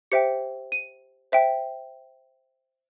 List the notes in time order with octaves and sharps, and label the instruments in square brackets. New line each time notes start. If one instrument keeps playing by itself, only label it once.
[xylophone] G4 C5 E5 G5 C#7
D#7
C5 E5 G5